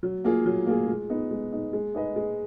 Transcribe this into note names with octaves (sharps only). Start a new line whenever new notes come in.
F#3
A#3 F4 G#4
F#3
A#3 F4 G#4
G#3
B3 D#4
G#3
B3 D#4
G#3
D#4 G#4 B4 D#5
G#3